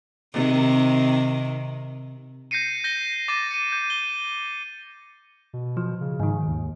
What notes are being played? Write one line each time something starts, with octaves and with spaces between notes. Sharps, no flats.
C3 D#3
G6 A#6 C7 C#7 D#7
G6 A#6 G7
D6 A6 A#6 D#7
C#7 D#7
G6
G7
B2
F3
C#3
G#2 D#3
D#2